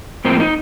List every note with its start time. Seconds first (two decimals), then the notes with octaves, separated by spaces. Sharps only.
0.25 A2 F3 A#3 C4
0.40 D#4